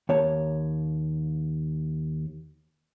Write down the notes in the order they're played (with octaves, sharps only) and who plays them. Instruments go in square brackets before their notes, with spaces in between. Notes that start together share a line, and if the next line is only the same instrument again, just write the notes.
[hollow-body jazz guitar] D#2 C#5 A5